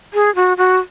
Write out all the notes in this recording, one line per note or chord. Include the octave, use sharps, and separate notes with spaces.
G#4
F#4
F#4